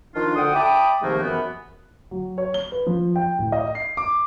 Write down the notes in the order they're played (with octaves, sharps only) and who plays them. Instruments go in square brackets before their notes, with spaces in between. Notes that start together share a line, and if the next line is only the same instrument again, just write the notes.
[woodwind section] D#3 F3 D4 F4
D2 D3 F#5 G5 D#6
E5 G5 A5 B5 D6 D#6
G#2 C3 D#3 F3 A3 A#3
F#2 E3 B3
[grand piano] F#3
C#5
G7
B4
F3
G5
A2
D#5
C7
D6